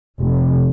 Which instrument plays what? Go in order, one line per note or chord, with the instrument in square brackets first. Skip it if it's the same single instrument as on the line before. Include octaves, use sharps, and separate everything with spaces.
[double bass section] F1